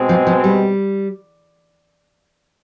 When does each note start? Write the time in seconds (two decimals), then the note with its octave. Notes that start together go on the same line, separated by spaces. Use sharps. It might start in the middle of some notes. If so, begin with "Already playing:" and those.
Already playing: B2 G#3 C4
0.09 F3
0.27 F3
0.44 G3